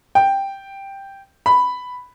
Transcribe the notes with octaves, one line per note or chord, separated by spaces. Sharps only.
G5
B5